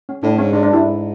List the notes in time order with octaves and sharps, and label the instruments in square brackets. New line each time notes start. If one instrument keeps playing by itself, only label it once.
[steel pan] C#4
[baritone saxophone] A2 [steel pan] D4
[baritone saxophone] G#2 [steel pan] C#4
[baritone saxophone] G#2 [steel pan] D4
[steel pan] D4
[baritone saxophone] G2
[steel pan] E4
[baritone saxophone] G#2